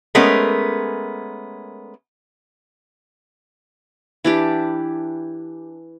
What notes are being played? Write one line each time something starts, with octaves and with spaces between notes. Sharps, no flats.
G#3 A3 B3 C#4 A#4
E3 D4 G4